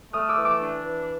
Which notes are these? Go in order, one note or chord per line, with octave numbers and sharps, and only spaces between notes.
A3 D#6 F6
D6 E6
E3
D6 E6
D4
E3